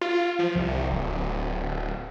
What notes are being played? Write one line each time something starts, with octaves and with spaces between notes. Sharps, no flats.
F4
F3
C2
D1